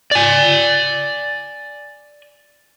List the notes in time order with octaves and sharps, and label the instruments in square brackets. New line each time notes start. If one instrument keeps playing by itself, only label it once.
[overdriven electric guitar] D5 G#5